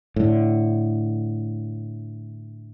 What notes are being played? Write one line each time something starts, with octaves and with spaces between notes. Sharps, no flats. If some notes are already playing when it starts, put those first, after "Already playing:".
A2 D3